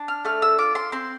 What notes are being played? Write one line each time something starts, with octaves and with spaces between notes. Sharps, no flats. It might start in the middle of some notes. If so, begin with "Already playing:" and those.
Already playing: D4
F6
A3 F6
E6
F4 D6
C6
C4 C6